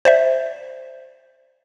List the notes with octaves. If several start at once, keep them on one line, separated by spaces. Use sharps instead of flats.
C5 D5 E5